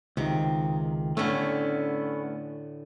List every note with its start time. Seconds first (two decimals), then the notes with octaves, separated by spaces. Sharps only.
0.17 C#2 C3 D#3
1.17 A2 D3 A3 B3 C#4